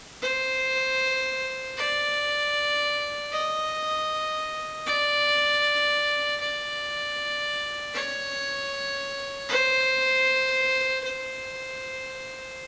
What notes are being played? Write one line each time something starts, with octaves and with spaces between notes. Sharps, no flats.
C5
D5
D#5
D5
D5
C#5
C5
C5